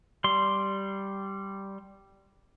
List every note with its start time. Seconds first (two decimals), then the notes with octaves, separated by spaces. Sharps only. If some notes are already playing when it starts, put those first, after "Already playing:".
0.24 G3 C6